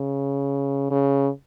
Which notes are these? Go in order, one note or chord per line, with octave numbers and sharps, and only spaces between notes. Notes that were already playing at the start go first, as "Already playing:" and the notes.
Already playing: C#3
C#3